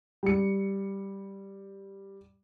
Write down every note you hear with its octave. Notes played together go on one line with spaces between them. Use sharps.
G3 C#7